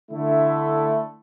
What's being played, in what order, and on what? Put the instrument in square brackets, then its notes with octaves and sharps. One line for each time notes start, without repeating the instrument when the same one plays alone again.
[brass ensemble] D3 A3 E4